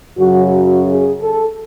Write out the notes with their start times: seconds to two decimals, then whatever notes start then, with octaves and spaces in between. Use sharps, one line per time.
0.18 F#2 C#3 F#3 F#4
0.53 F#4
0.87 G#4
1.21 A4